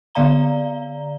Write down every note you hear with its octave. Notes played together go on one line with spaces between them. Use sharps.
D3 B3 D5 F5 A#5 G7